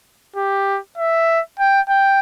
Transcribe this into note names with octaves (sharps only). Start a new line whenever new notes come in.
G4
E5
G5
G5